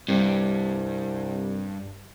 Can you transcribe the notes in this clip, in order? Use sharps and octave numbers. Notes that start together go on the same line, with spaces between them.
C2 G2